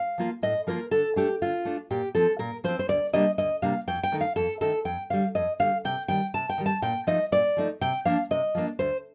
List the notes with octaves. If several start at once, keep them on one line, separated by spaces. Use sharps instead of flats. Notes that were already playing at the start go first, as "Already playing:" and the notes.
Already playing: F5
F3 A#3 F4
A2 D#5
F3 A#3 F4 A#4
D3 A4
A3 D4 G4
D3 F4
A3 D4
A#2 G4
F3 C4 A4
A#2 A#4
F3 C4 C5
C5
D2 D5
C3 G3 A#3 D4 D#5
D2 D#5
C3 G3 A#3 D4 F5
F2 G5
G5
D#3 A3 D#4
F5
F2 A4
D#3 A3 D#4 A4
F2 G5
D3 G3 F5
F2 D#5
D3 G3 F5
C3 G5
D#3 G3 G5
C3 A5
G5
D#3 G3
A5
A#2 G5
F3 A3 D#4 D#5
A#2 D5
F3 A3 D#4
C3 G5
F3 A#3 D4 F5
C3 D#5
F3 A#3 D4
D2 C5